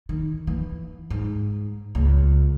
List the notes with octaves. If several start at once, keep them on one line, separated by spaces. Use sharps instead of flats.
D#3
E3
G#2
C#2